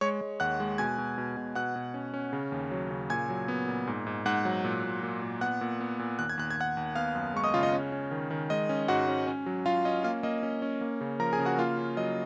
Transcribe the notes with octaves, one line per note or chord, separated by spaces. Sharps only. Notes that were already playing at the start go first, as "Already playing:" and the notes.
G#3 C#5 C#6
G#3
D#2 F#5 F#6
G#3
B2 G#5 G#6
B2
B2
B2
B2 F#5 F#6
B2
C#4
C#4
C#3
D#2
F#3
C#3
A#2 G#5 G#6
F#3
B3
A#2
G#2
G#2
G#2 F#5 F#6
F#3
A#2
A#2
A#2
A#2
B3 F#5 F#6
A#2
B3
A#2
D#2 F#6
G#6
D#2 F#6
G#6
D#2 F#5 F#6
D#2
B3 F5 F6
F#2
G#3 C#6
D#5 D#6
C#3 F4 F5
D#5
C#4
C#4
D#3
D#3
G#3 D#5
C#4
G#2 F#4 F#5
C#4
C#4
F#3
F#3 F4 F5
C#4 D#5
A#3 F4 F5
A#3 D#5
C#4
C#4
A#3
C#3
F3 A#4 A#5
G#4 G#5
C#3
F#4 F#5
A#3 F4 F5
C#4
F#3 D#5